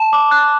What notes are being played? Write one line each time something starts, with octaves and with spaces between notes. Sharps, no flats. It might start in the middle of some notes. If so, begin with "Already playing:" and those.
Already playing: A5 E7
D6
F#6